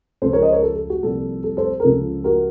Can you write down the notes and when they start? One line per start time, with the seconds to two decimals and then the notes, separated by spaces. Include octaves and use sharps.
0.22 C#2 C#3 F3 A4 C5
0.33 A#4 C#5
0.42 C5 D#5
0.52 A#4 C#5
0.62 A4
0.76 A4
0.90 F#4
1.03 C2 A#2 F3 A4
1.44 A4
1.57 A4 C5
1.80 A#4
1.84 C#2 C#3 F3 A4
2.24 F#4 A#4